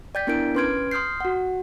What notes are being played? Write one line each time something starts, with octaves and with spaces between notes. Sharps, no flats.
D5 G5 G6 A6 B6
B3 D4 E4 A#4 G6 D7
C#4 B4 C6 F6 G#6 D7
C6 D#6 F6 G6 C7
F#4 F#5